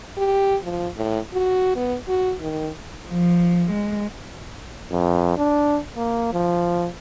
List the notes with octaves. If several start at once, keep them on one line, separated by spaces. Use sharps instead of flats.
G4
F3
A2
F#4
B3
F#4
D#3
F3
G#3
F2
D4
A#3
F3